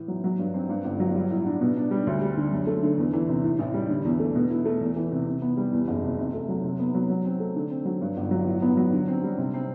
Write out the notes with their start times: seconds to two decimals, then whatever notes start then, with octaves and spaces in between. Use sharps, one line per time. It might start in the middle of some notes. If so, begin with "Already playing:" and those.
Already playing: A2 E3
0.08 F#3
0.24 F#3
0.39 G2
0.54 C4
0.69 G2
0.84 G1
1.00 F#3
1.15 G3
1.30 A2
1.46 D4
1.61 B2
1.77 D4
1.91 G3
2.07 D2
2.22 G3
2.37 D3
2.52 F#2
2.67 A3
2.83 D3
2.98 E2
3.13 E3
3.29 C3
3.44 A2
3.59 A1
3.74 G3
3.89 D3
4.05 E2
4.20 A3
4.35 B2
4.50 E4
4.65 A3
4.81 E2
4.96 E3
5.12 C3
5.26 C3
5.42 B3
5.57 G3
5.72 E2
5.88 F#1
6.03 C3
6.19 C3
6.34 A3
6.49 F#3
6.64 C3
6.79 B3
6.94 F#3
7.10 F#3
7.25 C4
7.40 A3
7.56 D3
7.70 C4
7.85 F#3
8.01 G2
8.17 G1
8.31 F#3
8.47 A2
8.62 B3
8.77 F#3
8.92 D3
9.08 C4
9.23 G3
9.38 C3
9.54 C4